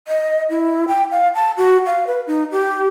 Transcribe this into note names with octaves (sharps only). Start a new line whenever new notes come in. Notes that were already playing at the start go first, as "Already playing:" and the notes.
D#5
E4
G5
F5
A5
F#4
F5
B4
D#4
G4